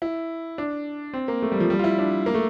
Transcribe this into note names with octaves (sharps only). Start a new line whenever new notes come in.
E4
D4
C4
A#3
A3
G3
F3
G3
F4
E4
D4
A#3
A3